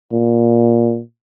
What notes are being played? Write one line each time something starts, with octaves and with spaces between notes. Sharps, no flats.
A#2